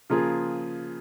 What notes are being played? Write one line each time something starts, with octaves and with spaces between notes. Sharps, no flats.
C#3 F3 A#3 F4 G#4